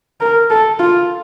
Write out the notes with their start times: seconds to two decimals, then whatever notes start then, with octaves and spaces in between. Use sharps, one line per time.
0.21 A#4
0.50 A4
0.79 F4